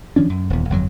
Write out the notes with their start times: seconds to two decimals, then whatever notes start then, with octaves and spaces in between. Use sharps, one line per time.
0.16 E3 F3 C#4 D4
0.30 F#2
0.50 D#1 E2
0.70 G1 F2 F#3